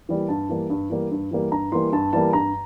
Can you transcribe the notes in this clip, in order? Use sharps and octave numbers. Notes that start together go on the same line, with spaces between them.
E3 G3 A#3
G2 A5
E3 G3 A#3
G2
E3 G3 A#3
G2
E3 G3 A#3
G2 A#5
E3 G3 A#3 C6
G2 A5
E3 G3 A#3 A5
G2 A#5